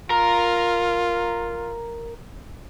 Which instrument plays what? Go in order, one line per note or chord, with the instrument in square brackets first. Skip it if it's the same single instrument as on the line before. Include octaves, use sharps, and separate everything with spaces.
[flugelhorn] F4 [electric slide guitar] A#4 A#5